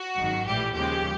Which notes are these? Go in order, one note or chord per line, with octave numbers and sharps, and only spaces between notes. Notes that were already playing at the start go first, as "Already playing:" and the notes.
Already playing: F#4
G#1 F#2 D#3
A#1 A2 E3 G3 G4
D#2 C#3 F3 G#3 G4